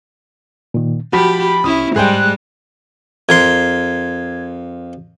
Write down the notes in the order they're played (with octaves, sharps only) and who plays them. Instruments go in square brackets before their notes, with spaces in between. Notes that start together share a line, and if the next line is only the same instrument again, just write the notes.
[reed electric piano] A#2 D#3
[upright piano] F3 [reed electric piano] F#4 [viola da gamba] G4 [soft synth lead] B5
[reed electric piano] C2 [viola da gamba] C#4 E4 [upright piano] D#6
[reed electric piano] G#2 [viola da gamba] G3 G#3 [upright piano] G#4 C5 G5 [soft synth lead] F#6
[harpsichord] F2 A#4 C6 [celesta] G#6